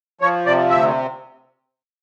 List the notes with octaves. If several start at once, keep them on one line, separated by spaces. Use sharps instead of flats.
F3 C#5
C3 D5
D2 E5